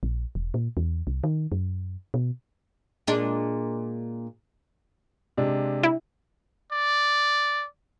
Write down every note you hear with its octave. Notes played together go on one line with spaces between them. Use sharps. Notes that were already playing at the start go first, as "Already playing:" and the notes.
A#1
E1
A#2
E2
C2
D#3
F#2
B2
A#2 G#3 D4
C3 G#3 D4
E4
D5